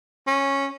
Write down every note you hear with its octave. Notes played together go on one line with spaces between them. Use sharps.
C#4